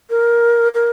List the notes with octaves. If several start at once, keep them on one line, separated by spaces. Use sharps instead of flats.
A#4
A#4